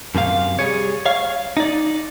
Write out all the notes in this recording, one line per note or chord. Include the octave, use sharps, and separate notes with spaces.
F#2 C3 G#4 F5
G3 G#4 C#5
C#5 F5
D#4 D5